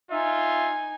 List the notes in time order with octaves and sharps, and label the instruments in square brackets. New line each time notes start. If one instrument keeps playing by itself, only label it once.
[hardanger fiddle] D#4 G#5 [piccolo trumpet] F4 [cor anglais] E5